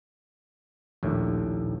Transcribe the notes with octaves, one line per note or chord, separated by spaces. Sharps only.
A#1 D#2 A2